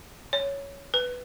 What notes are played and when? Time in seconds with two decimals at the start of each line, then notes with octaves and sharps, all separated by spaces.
0.33 C#5
0.94 B4